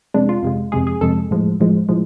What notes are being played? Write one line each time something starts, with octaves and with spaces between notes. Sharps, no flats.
F2 C3 G#3 D4
F4
F2 C3 G#3
F2 C3 G#3 G#4
G#4
F2 C3 G#3 A4
A2 F3 G#3
A2 F3 G#3
A2 F3 G#3